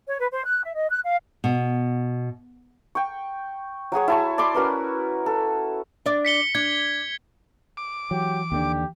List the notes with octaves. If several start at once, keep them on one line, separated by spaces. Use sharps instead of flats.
C#5
B4
C5
F#6
E5
D#5
F#6
F5
B2
G5 C#6
F#3 F#4 G#4 C#5
E4 A5 C#6
D5 B5 C6 D6
C#4 F#4 A#4 B4
A4
D4 D5
B6 C#7 G7
D4 G#6
D6
E3 F#3 G4
D#2 D3 D4 G4